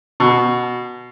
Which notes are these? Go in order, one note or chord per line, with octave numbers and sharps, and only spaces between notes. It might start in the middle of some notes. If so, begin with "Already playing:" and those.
B2